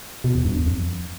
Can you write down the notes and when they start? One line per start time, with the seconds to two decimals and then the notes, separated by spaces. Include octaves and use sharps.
0.24 B2
0.35 E2
0.45 G2
0.56 E2
0.66 F2